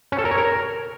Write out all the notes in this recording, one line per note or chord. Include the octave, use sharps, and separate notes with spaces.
C#4
A4
A#4
C#5
A#4